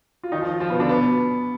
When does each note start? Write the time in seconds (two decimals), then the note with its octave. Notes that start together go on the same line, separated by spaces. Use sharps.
0.23 F4
0.32 D#3 D#4
0.41 F3 F4
0.60 F3 F4
0.70 B2 B3
0.80 D3 D4
0.89 B2 B3